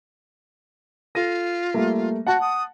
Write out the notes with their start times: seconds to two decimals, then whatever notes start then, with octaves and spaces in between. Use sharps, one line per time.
1.15 F4 A4 A#6 D#7
1.74 G3 A3 A#3
2.27 F#4 F#5 A5
2.40 D#6